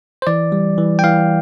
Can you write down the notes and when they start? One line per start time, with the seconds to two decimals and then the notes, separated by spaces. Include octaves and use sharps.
0.22 C5
0.27 E3 D5
0.52 G3
0.78 E3
0.99 G5
1.04 E3 F5